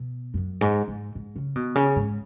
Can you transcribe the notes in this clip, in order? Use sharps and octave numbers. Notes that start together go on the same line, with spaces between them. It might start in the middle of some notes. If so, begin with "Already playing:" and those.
Already playing: B2
F#2
G#2
G#2
G#2
C#3
B2
C#3
G#2